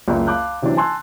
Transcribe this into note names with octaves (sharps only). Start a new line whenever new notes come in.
F#1 C#2
F5 A5 B5 D6 F#6 G6
C3 E3 F#3 C#4 D4
G#5 A5 C6 E6 F#6